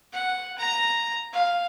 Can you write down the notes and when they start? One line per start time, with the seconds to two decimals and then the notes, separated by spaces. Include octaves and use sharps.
0.13 F#5
0.58 A#5
1.33 F5